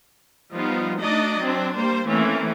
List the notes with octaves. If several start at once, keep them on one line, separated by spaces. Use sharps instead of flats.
F3 G3 B3 D#4 F4
A3 D4 D#4 F#4 D5 D#5
F#3 C4 D4
G3 A#3 C5
E3 A3 A#3 C4 C#4 E4